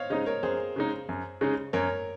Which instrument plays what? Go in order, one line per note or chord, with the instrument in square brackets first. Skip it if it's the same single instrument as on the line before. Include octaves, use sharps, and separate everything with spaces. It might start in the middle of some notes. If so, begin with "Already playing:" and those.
Already playing: [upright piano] C5 C#5 D#5 F5
[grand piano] C#3 G#3 D#4 [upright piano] C5 D#5
[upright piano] A#4 C#5
[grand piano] F#2 [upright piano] G#4 C5
[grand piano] C#3 G#3 D#4
F#2
C#3 G#3 D#4
[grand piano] F#2 [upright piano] A#4 C#5